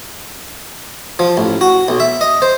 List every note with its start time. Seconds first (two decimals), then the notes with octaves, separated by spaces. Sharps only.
1.19 F3
1.37 A1
1.61 F#4
1.88 B1
2.00 E5
2.21 D#5
2.42 C5